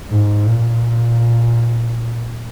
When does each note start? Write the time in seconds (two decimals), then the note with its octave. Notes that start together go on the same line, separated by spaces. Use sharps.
0.10 G#2
0.46 A#2